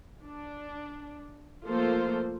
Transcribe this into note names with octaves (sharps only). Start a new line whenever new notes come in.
D4
F3 A3 A#3 F4 A4 C5